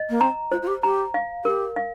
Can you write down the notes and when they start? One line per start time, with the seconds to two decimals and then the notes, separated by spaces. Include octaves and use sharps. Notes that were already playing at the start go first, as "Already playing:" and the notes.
Already playing: D#5
0.10 A#3
0.21 C4 A#5
0.52 F4 C5
0.62 F4
0.67 G4
0.83 G4 A#5
1.14 F5
1.45 G4 A#4
1.76 F5